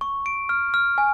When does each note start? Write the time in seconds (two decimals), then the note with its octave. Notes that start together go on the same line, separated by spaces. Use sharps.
0.01 C#6
0.26 D7
0.49 F6
0.74 F6
0.98 G#5